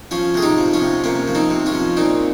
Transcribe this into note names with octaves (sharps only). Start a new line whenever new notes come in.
F3 C#4 F4
C3 G#4
D#4 G4
F3
C#4 F4
C3
C3 A#3 C#4
F3
C4 D#4
C3
C#4 F4
F3
A#2 C4 D#4